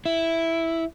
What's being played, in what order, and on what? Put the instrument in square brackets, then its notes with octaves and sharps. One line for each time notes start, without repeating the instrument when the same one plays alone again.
[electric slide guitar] E4